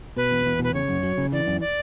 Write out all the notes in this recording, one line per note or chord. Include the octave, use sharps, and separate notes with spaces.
B2 B4
E2
E2
B2 B4
C#3 C#5
F#2
F#3
C#3
E3 D5
F#2
D5